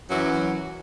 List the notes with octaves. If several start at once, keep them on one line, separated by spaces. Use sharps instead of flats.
F#2 E3 F#3